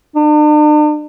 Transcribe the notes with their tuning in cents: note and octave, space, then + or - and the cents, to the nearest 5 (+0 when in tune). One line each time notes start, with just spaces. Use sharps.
D4 +45